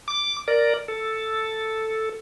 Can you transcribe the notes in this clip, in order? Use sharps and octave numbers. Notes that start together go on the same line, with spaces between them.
D6
A#4 D5
A4